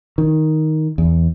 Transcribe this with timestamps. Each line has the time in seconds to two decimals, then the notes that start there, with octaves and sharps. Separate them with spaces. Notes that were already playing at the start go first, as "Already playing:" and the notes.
0.18 D#3
0.98 E2